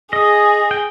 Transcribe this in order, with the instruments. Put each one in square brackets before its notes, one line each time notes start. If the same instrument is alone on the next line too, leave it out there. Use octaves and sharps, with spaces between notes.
[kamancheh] G#4 [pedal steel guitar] D#5
[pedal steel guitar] G5